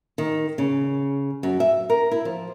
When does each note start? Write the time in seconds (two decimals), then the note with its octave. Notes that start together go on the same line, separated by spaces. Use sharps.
0.18 D#3
0.58 C#3
1.43 F#2
1.60 E5
1.90 A#4
2.11 E4
2.25 F3